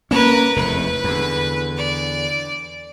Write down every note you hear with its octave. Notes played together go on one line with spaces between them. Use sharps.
A#3 C#4 A#4 B4
F1 E2 C3 B4
E2 D3
D5